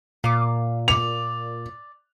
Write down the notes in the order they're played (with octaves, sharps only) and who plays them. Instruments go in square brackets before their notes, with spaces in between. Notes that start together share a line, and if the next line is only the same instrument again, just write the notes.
[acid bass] A#2 [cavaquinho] F5 D6
[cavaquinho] D5 D6 [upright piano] F7